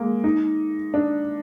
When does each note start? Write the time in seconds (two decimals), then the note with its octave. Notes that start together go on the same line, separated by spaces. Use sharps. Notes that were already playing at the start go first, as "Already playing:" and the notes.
Already playing: G#3 A#3
0.24 D#4
0.94 D4